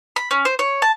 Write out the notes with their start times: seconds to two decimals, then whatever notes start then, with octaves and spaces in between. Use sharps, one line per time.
0.16 B5
0.31 C#4
0.45 C5
0.59 C#5
0.82 A5